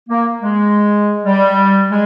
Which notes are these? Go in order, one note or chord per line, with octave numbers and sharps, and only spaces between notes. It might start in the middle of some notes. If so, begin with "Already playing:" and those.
A#3
G#3
G3
G#3